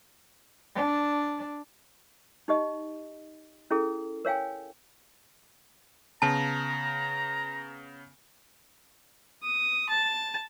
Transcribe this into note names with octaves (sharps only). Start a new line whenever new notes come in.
D4
D#4 G4 D#5
C#4 E4 G#4 A4
A#4 C#5 F5 G5 G#5
C#3 B3 A5 A#5
D#6
A5